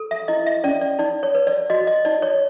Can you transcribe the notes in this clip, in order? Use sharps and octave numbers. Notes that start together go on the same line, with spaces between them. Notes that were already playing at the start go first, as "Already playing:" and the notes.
Already playing: A4
E5
E4 D#5
E5
C#4 D5
D5
D#4 D5
C#5
B4
D5
F#4 D#5
D#5
D#4 D5
C#5